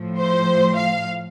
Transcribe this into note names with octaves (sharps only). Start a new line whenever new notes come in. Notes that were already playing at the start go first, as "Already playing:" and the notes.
Already playing: A2 F3
C5
F5